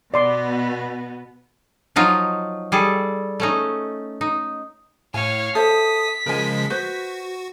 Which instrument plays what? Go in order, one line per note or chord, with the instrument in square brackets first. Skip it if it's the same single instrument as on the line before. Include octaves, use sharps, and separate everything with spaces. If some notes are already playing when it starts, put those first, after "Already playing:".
[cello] B2 B3 [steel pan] D5 C6 D6
[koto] F3 F#3 D#4 F4
G3 G#4 A4
A3 C#4 D#4
D#4
[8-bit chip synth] A2 [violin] C#5 F5 [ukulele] G#5
[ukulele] A4 C5 E5 [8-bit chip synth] D#6 [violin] B6
[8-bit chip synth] C#3 F3 G#3 [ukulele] A#4 G#5
[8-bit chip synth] F#4 [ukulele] B4 C5